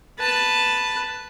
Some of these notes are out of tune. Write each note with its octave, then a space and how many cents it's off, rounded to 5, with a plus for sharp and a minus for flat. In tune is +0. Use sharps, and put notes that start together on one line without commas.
B4 +0 A5 +0